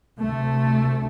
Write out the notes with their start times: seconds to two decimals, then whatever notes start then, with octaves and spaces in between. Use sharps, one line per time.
0.19 D2 C3 A3